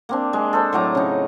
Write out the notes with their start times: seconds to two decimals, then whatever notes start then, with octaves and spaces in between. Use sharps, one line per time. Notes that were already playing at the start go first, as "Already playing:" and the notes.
0.09 A#3 C4 D4
0.33 G#3
0.53 A4 C5
0.73 A2 F#3 D5 A#5
0.95 C#3 D#4